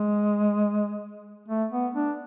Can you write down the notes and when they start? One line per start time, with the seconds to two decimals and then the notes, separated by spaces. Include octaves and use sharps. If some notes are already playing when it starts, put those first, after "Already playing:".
Already playing: G#3
1.48 A3
1.72 B3
1.95 D4